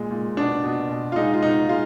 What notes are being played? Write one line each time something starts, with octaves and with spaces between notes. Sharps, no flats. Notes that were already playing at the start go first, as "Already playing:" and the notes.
Already playing: A#2 G#3
A#2
B2 D4
B2
B2
F4
G#3 D#4
F4
B2 D#4
G#3 F4